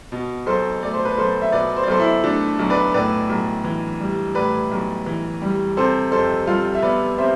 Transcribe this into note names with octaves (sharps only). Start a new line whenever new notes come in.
B2
B1 A4 C5
A3 D5
C5
B4
B1 A4 C5
E5
B2 B4 D5
C5
D5
B1 A4 C5
E4
A3 D4
B1
B4 D5
A2 B4 D5
B1
E3
G3
A2 B4 D5
B1
E3
G3
C3 A4 C5
F2 A4 C5
G3 F4 A4
E5
B3 B4 D5
C3 C5 E5